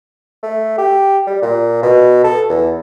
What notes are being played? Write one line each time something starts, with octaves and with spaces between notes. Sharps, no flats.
A3
G4
G3
A#2
B2
A4
E2